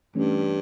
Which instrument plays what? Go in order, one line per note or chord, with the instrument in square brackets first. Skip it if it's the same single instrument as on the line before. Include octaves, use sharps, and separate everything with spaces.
[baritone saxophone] G2 [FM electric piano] E3 A3 C#4